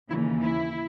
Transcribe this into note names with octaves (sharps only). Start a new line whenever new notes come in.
D#2 C#3 E3 E4
E4